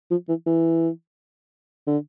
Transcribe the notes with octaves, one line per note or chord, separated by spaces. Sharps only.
F3
E3
E3
D3